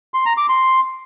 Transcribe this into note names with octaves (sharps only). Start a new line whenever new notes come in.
C6
A#5
D6
C6